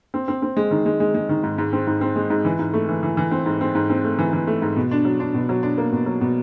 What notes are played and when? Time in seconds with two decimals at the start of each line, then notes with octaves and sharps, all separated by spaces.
0.14 C4
0.28 C4
0.42 C4
0.57 G#3
0.71 D#3
0.86 G#3
1.00 G#3
1.14 G#3
1.29 D#3
1.44 G#2
1.58 G#2
1.73 C4
1.87 G#2
2.01 C4
2.16 G#3
2.30 G#2
2.45 E3
2.59 G#2
2.74 A3
2.89 E3
3.03 E3
3.17 E3
3.31 C4
3.46 G#2
3.61 C4
3.75 G#2
3.90 C4
4.04 A3
4.19 E3
4.33 E3
4.47 A3
4.62 G#2
4.77 B2
4.91 D4
5.05 F#3
5.20 D4
5.34 B2
5.49 F#3
5.63 D4
5.78 A#3
5.92 B2
6.06 F#3
6.21 B2